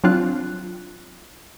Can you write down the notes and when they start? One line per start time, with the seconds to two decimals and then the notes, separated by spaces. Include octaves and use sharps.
0.04 F#3 C4 D4 F4 F#6